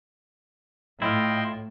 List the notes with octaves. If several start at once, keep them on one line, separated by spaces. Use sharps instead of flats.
A2 E4 F4 D#5 G5 C6